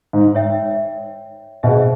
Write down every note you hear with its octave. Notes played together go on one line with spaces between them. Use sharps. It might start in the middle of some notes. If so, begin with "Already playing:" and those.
G#2
C#5 E5 G5
B2 G#4 C5 E5